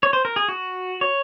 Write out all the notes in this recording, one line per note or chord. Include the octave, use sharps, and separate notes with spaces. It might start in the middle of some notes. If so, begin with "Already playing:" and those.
C#5
C5
A#4
G#4
F#4
C#5